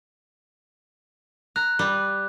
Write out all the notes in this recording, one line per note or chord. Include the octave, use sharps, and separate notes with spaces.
A#5 F#6
G3 B4